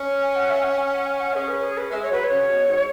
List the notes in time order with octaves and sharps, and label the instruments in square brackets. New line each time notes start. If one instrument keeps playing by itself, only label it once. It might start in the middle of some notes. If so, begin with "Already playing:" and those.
Already playing: [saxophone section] C#4
[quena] G#5
F#5
E5
G#5
F#5
G#5
F#5
G#5
F#5
[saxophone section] C#4 [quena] G#4
[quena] B4
G#4
B4
[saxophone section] G#3 [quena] E5
[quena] C#5
[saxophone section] F#3 [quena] B4
[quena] C#5
[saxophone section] C#3
B2
G#2